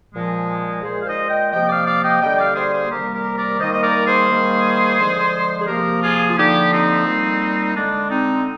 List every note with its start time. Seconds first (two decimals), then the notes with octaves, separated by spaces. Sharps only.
0.13 A#2 F3 G#3
0.82 A#2 G#3 G#4 C5
1.01 F5
1.06 C5 D#5
1.29 D#5 G5
1.52 C3 F3 A#3 D#5 G5
1.69 D5 F5
1.87 D5 F5
2.03 D#5 G5
2.21 D3 G3 A#3 D#5 G5
2.38 D5 F5
2.56 G#4 C5
2.73 G#4 C5
2.90 C3 D#3 G3 A#3 G4 A#4
3.13 G4 A#4
3.36 A#4 D5
3.60 D#3 G3 A#3 C5 D#5
3.73 D#5
3.83 A#4 D5
4.06 G#4 C5
4.29 D#3 G3 A#3
4.99 D3 F3 G#3
5.61 G#4
5.67 C3 F3 A#3 G4 A#4
6.02 F4 G#4
6.29 F4
6.37 D3 F3 A#3 D#4 G4
6.71 C4 D#4
7.06 A#2 G3 A#3
7.76 D3 G#3 D4
8.10 C4 D#4